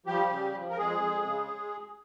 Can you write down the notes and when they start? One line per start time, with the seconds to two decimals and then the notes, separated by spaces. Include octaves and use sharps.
0.06 F3 G3 G4
0.30 C#3
0.54 F3
0.70 A#4
0.77 F2 G#3 G#4
1.02 F2
1.25 C#3